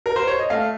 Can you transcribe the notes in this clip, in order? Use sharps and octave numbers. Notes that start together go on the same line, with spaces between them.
A#4
C5
C#5
D#5
A3 F5